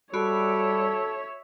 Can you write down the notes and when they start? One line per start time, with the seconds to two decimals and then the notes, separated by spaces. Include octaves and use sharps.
0.14 G3 F#4 A4 C#5 E5 B5 D7